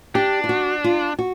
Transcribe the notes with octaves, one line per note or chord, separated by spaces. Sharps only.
D4 G4
F4
F#4
F4
F#4